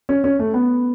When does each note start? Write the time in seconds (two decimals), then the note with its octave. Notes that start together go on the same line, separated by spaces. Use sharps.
0.09 C#4
0.24 C#4
0.39 A3
0.54 B3